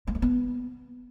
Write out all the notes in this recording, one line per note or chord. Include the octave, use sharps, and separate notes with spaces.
G#3
A3
B3